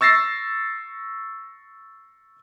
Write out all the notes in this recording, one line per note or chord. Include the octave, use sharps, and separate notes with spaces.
C#6 E6 A6 A#6 C7